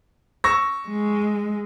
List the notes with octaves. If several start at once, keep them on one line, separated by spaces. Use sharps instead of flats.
C#6 E6 A#6
G#3